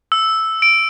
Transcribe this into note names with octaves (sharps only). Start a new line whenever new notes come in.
E6
D7